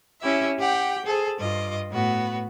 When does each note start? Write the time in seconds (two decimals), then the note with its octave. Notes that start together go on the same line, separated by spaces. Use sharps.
0.21 C#4 E4 G4 E5
0.58 G4 F#5 G5
1.05 G#4 A4 C5
1.37 G2 F4 D#5 D6
1.90 A2 B3 F#4 B4